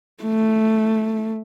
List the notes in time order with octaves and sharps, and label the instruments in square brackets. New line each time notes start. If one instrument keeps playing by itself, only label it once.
[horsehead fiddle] A3